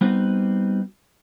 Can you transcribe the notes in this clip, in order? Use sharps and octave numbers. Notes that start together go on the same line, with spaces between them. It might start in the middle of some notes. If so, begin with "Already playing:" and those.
G3 B3 C4 D#4 F#4